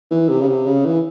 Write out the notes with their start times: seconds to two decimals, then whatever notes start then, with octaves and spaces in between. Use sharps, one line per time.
0.11 E3
0.29 C3
0.41 C#3
0.48 C3
0.66 C#3
0.85 E3